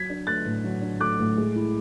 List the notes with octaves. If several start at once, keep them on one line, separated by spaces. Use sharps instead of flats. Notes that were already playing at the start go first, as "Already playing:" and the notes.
Already playing: F#3 G#6 B6
D4
A3 F#6 A6
A2
F#3
D4
A3 D6 F#6
A2
G#3
E4